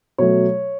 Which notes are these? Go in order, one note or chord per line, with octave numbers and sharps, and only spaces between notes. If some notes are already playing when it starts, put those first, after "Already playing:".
B2 F#3 A3 C#5